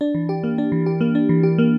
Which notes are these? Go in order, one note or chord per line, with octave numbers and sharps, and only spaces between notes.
D4
E3
G4
A#3
D4
E3
G4
A#3
D4
E3
G4
A#3